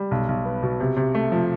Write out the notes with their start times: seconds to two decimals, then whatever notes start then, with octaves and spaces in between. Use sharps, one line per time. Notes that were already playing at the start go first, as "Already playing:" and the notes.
Already playing: G3
0.11 B1
0.29 B1
0.45 B3
0.63 B2
0.80 C3
0.97 C3
1.15 A3
1.32 F3